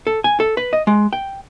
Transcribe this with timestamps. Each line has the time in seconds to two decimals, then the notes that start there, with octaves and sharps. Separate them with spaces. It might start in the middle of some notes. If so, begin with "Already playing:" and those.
0.07 A4
0.24 G#5
0.40 A4
0.57 B4
0.73 D#5
0.87 G#3
1.13 G5